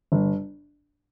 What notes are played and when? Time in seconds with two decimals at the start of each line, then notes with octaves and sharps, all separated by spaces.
0.12 G1